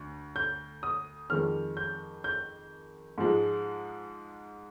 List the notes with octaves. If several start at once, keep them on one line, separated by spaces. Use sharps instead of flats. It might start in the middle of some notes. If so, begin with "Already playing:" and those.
Already playing: D2
G6
D#6
F2 D#3 G#3 F6
G6
G6
G#2 F3 G#3